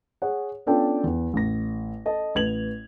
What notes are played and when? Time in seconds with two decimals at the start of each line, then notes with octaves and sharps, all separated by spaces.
0.22 G#4 C#5 F#5
0.66 B3 C#4 D4 F4 A4 G5
1.04 E2
1.33 A1 A#6
2.06 A4 D#5 A5
2.35 A1 B4 G#6 F7 F#7